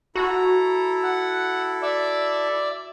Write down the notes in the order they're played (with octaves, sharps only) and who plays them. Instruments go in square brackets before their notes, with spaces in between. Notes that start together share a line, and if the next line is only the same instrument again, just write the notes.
[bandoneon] E4 A4 [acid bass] F#4 [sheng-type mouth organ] A#5
[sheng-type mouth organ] F#5
D5 E5